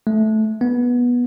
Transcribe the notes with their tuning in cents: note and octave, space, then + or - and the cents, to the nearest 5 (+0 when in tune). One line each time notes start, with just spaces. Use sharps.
A3 -15
B3 -15